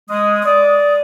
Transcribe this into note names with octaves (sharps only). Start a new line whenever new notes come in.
G#3 D#6
D5 D#6